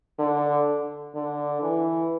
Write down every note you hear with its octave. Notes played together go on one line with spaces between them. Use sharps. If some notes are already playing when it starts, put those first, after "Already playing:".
D3
D3
E3